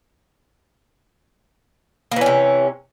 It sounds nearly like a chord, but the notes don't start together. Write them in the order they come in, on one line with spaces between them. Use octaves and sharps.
A#3 E3 C#4 C3